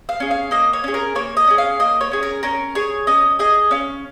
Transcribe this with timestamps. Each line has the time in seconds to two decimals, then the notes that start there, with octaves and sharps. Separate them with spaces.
0.09 F5
0.20 C#4 G#4
0.31 F5
0.51 A#3 D#5
0.73 C#5
0.84 C#4 G#4
0.94 A#4
1.15 A#3 C#5
1.37 D#5
1.48 C#4 G#4
1.58 F5
1.79 A#3 D#5
2.01 C#5
2.11 C#4 G#4
2.23 A#4
2.43 C#4 A#4
2.75 G#4 C#5
3.07 C#4 D#5
3.39 G#4 D#5
3.71 C#4 F5